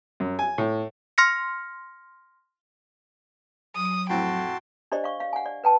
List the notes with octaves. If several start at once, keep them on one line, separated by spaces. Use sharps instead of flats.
F#2
G#5
A2
C6 F6 A#6 C#7
F#3 D#6
F2 A2 C4 F#4 G5 A5 C6
D4 G4 C5 D5 D#5
F5 C#6
F5
F#5 G#5
D5
B4 G5 A5